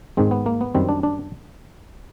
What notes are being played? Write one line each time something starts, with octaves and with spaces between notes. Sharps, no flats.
G#2 D#3 G#3 C4
B3
A#3
B3
F#2 D#3 G3 C4
D4
D4